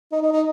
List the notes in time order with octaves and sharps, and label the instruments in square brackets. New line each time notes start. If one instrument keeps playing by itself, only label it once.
[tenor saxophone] D#4
D#4
D#4